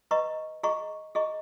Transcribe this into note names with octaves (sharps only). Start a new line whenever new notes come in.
B4 D#5 A#5 C#6
G#4 D#5 A#5 C#6
G#4 D#5 A#5 C#6